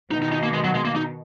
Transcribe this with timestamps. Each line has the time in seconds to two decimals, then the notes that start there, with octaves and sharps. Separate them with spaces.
0.11 B2 D#3 D#4
0.22 D#4
0.32 D#4
0.43 A#3
0.53 G#3
0.64 F#3
0.75 G#3
0.85 A#3
0.96 D#4